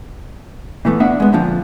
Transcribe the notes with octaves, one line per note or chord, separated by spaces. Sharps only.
A#2 E3 A3 B3
B3 D4 E5 F#5
G#3 B3
F2 A#2 D3 F3